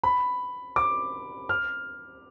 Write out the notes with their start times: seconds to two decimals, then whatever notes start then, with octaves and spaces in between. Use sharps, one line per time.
0.03 B5
0.76 D6
1.49 F6